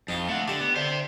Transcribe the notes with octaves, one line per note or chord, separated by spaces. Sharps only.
F2 D#4 F4 F5
A3 F#5
D3 G4 D5
B3
D3 C5 E5